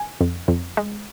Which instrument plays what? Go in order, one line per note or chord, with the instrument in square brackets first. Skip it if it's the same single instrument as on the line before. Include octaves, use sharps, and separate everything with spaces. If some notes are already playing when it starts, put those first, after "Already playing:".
Already playing: [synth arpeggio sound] G#5
F2
F2
G#3